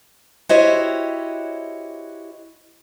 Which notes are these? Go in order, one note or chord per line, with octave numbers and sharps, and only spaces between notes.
E4 F#4 G4 C5 C#5 D#5